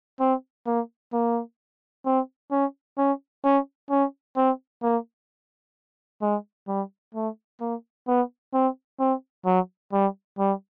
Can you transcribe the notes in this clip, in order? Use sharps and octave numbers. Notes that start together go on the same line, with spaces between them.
C4
A#3
A#3
C4
C#4
C#4
C#4
C#4
C4
A#3
G#3
G3
A3
A#3
B3
C4
C4
F#3
G3
G3